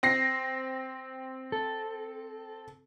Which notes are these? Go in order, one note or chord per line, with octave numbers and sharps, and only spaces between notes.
C4 A#6 C7
A4